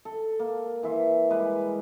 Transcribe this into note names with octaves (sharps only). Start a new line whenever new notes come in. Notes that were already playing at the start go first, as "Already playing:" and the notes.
A4
A#3
E3 E5 C6
G3 G#3 B4